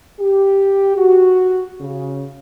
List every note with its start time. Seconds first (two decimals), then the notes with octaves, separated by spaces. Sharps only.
0.20 G4
0.97 F#4
1.81 C#3